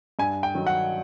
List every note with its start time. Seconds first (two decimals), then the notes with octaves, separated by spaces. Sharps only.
0.19 G2 G#5
0.43 G5
0.55 D#3 F#3
0.67 F#5